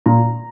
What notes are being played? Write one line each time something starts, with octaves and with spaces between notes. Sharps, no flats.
A#2 A#5